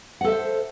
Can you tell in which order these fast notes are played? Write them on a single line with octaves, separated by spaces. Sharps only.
F#5 A4 E5 C5